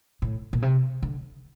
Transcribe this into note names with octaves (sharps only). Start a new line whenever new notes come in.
A2
A#2
C3
D3